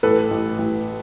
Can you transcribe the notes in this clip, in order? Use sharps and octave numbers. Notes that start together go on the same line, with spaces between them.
A1 A4 B4
A1
A1